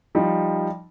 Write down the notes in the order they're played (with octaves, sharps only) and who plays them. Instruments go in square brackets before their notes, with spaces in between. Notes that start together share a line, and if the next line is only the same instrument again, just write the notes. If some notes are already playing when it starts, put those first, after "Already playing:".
[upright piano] F3 G3 D#4